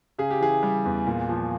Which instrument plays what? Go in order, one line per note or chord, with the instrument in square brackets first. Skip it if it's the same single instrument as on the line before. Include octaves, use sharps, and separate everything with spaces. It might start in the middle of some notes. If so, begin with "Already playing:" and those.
[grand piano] C#3 G#4
G4
E3 G#4
G3
E2
A#2
F3